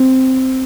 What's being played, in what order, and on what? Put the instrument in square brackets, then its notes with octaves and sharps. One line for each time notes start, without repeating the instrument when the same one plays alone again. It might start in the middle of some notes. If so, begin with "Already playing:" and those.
Already playing: [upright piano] C4